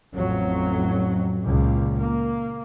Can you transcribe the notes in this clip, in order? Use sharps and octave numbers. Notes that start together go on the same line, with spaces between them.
A1 F2 F#3
C#2 A#2
A#3